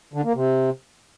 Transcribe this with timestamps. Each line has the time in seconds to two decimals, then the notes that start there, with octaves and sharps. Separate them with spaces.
0.14 D3
0.24 A#3
0.35 C3